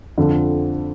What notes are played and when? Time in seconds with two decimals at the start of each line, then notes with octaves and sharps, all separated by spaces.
0.18 F2 D3 F3